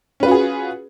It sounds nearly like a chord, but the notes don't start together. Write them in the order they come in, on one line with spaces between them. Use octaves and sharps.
C#4 B4 F4 F#4 G#4